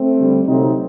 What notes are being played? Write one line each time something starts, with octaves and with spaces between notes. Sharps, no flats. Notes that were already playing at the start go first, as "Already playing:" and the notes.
Already playing: A3 C4
D3 G3
C3 F#3 A3 C4 D#4